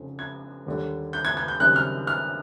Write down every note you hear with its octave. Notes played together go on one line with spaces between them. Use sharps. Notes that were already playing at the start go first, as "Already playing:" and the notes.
Already playing: F1 F2 C#3
G#6
D#2 D3 G3
G6
G#6
G#6
G6
F#1 F#2 D#3 G3 C4 F#6
F6
F6